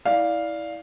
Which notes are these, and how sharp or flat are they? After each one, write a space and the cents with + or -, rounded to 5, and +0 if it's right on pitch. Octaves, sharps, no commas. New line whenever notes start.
E4 -25 D5 -5 F5 +0